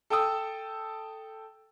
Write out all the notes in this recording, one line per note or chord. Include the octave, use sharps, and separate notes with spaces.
A4 G5 A5 D#6 E6